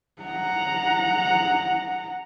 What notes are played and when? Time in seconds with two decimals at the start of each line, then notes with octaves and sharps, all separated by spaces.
0.22 F#5 A#5